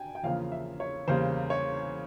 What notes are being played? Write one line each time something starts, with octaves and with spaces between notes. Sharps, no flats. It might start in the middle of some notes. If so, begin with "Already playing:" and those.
Already playing: G5 G#5
G5
E2 C#3 F3 A#3 F4 F5
E5
C#5
E2 C#3 G3 A#3 C5
C#5